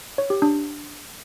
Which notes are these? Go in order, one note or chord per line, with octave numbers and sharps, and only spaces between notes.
C#5
G4
D4